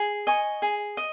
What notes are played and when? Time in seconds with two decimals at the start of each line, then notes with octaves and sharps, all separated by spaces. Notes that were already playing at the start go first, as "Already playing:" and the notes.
Already playing: G#4
0.27 D#5 G#5 C#6
0.62 G#4
0.97 D#5